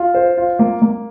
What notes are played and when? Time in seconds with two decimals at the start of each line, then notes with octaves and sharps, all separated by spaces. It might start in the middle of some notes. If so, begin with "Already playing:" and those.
Already playing: F4
0.15 C5
0.37 F4
0.59 A#3
0.82 A#3